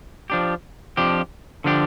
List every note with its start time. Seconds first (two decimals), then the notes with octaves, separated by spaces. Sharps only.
0.30 F3 D4 G4
0.97 F2 F3 D4 G4
1.64 D3 F3 D4 G4